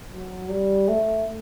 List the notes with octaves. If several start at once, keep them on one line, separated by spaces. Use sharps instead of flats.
F#3
G3
A3